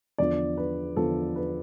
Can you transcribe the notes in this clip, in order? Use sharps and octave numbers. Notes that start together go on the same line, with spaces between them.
E2 D3 F3 D5
B4
E2 D3 F3 A4
B4